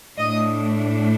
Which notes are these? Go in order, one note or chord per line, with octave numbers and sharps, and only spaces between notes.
A2 A3 D4 D#5